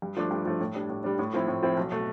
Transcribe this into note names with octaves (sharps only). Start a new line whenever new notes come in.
G2
F3 A3 D4
G2
F3 A3 D4
A2
G3 D4
A2
G3 D4
A2
F3 C4 E4
A2
F3 C4 E4
B1
B2 A3